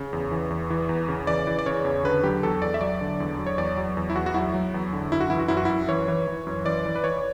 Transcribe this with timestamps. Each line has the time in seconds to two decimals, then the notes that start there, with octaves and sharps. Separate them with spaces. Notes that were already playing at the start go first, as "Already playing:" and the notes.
Already playing: C#3
0.13 E2
0.31 E3
0.50 E2
0.70 E3
0.89 E2
1.08 C#3
1.27 E3 D5
1.47 E3
1.59 D5
1.66 C#3 C#5
1.85 E2
2.04 D3 B4
2.23 F#3 G4
2.43 E2 A4
2.61 E2 D5
2.74 E5
2.81 F#3 D5
3.01 D3
3.20 E2
3.38 F#3
3.47 C#5
3.58 E2 D5
3.77 F#3
3.97 E2
4.10 E4
4.15 E2 F#4
4.26 F#4
4.34 F#3 E4
4.54 F#3
4.74 E2
4.93 D3
5.12 F#2 E4
5.20 F#4
5.30 E3 E4
5.39 F#4
5.48 F#2 E4
5.57 F#4
5.65 F#2 E4
5.88 E3 C#5
6.08 E3
6.27 E3
6.47 F#2
6.65 E3 D5
6.85 E3
6.95 B4
7.04 E3 C#5